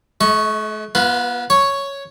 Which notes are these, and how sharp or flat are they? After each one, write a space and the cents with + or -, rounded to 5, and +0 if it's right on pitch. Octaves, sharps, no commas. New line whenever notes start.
A3 -45 D#5 +25 C#6 -5
B3 -35 F4 +0 B4 +0
C#5 +0 C#6 +0